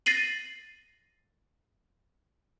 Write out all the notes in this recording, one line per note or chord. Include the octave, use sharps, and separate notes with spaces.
A6 A#6 C7 D#7 F#7